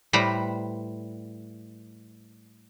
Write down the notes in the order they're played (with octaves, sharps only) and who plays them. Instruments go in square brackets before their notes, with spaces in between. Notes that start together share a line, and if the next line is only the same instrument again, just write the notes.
[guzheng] A2 G3 B4 C5 A#5 B5